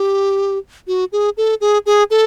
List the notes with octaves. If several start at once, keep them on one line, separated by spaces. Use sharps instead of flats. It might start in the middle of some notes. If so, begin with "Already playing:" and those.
Already playing: G4
F#4
G#4
A4
G#4
G#4
A4